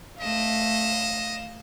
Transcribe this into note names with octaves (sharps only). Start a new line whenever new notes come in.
A3 D#5 F5 E7